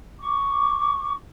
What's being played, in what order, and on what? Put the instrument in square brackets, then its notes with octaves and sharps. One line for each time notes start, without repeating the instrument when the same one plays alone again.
[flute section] C#6 D6